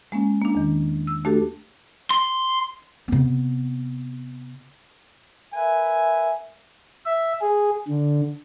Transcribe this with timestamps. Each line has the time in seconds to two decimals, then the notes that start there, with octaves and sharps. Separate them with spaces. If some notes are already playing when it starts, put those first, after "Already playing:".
0.12 G#3 A#3 C#4
0.42 A#3 D4
0.55 E2 D#3
1.07 E6
1.25 A3 D4 F#4 G4 A4
2.11 C6
3.08 C3 B3
5.54 A#4 B4 E5 G#5
7.05 E5
7.41 G#4
7.88 D3